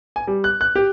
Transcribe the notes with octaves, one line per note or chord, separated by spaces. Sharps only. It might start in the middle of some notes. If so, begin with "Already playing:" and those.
G#5
G3
F#6
F#6
G4